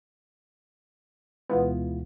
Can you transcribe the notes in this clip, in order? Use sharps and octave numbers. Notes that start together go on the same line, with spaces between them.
D2 B2 E3 G#3 B3 E4 F4